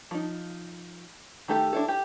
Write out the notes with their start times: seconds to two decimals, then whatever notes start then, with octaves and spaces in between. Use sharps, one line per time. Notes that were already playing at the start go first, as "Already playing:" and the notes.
0.11 F3 D#4
1.48 D#3 A3 G4 A4
1.73 D4 E4 A4
1.88 G4